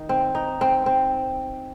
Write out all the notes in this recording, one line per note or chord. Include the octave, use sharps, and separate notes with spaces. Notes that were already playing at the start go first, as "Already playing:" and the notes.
Already playing: D#3 D#4
C4
D#4
C4
C4